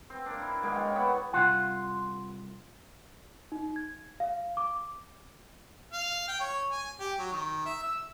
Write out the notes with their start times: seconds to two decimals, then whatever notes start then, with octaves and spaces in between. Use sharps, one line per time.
0.10 C4
0.26 A#3 D4
0.42 E4
0.63 G#2 G#3 A#3
0.74 C#5 G5 D6
0.96 B3 E5 F#5 C#6
1.33 C2 C#3 F4 F#5
3.52 D#4
3.76 G#6
4.20 F5
4.57 D6
5.93 F5
6.28 G5
6.40 C#5
6.71 G#5
7.00 G4
7.19 F#3
7.32 D#3
7.65 E5
7.83 E6